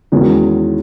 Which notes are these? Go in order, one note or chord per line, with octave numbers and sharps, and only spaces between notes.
E2 D#3 G#3 C#4 F#4